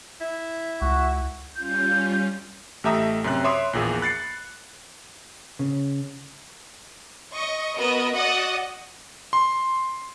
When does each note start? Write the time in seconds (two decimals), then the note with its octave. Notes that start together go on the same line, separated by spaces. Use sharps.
0.20 E4
0.82 C#2 F#4
1.55 G3 C#4 F4 G6
2.84 A1 A3 G4 E5 A#5 D#6
3.24 F#2 C3 F#6
3.44 C#5 E5 B5 C6 D6 D#6
3.73 A#1 E2 A#2 G#4
4.01 B5 F#6 A6 C7 C#7
5.59 C#3
7.34 D#5 C#6
7.77 B3 F#4 A#4 D#5
8.14 F#4 D5 D#5 F#5 D#6
9.33 C6